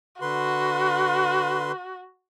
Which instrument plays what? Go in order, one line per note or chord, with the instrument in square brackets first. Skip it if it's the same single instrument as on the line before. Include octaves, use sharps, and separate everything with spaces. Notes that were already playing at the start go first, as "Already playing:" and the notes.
[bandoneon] D3 B4 C6 [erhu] F#4